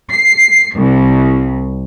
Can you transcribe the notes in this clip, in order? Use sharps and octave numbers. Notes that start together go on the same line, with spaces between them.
C7
C2